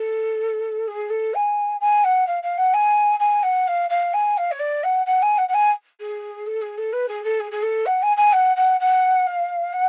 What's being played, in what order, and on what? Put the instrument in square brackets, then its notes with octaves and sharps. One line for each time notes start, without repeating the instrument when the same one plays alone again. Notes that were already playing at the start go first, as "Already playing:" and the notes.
Already playing: [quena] A4
G#4
A4
G#5
G#5
F#5
F5
F5
F#5
G#5
G#5
F#5
F5
F5
G#5
F5
C#5
D5
F#5
F#5
G#5
F#5
F#5
G#5
G#4
A4
G#4
A4
B4
G#4
A4
G#4
G#4
A4
F#5
G#5
G#5
F#5
F#5
F#5
F5
F#5